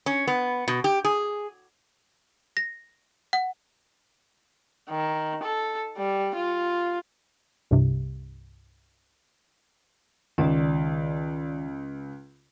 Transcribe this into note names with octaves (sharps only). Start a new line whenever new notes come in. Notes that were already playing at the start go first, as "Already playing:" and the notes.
C#4
B3
B2
G4
G#4
A#6
F#5
D#3
A4
G3
F4
C2 G2 C3
C#2 D#3 D5